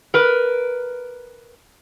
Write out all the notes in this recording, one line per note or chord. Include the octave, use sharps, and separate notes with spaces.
A#4 B4